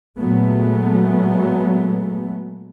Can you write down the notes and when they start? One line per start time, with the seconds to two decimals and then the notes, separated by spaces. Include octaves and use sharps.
0.18 A#2 F#3 G#3 A3 B3